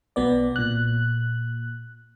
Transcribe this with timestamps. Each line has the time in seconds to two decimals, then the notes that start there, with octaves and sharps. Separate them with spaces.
0.16 B1 B2 B3 D5
0.56 A#2 F#6